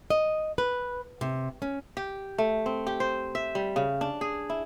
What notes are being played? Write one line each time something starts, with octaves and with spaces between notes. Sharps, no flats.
D#5
B4
C3
C#4
G4
A3
C4
G4
C5
E5
G3
C#3
D4
G#4
E4